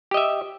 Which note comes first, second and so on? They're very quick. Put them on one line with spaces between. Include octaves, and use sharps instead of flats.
G4 D#5 E5